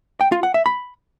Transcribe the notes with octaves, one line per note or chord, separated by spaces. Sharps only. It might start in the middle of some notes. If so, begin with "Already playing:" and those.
G5
F4
F#5
E5
B5